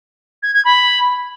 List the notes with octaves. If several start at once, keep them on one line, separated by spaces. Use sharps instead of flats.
G#6
G#6
B5